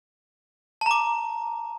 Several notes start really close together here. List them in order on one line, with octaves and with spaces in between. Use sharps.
A5 A#5 D6